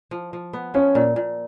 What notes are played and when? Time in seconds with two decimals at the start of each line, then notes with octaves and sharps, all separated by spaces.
0.11 F3
0.33 F3
0.53 B3
0.74 F3 C#4
0.95 A#2
1.16 A#2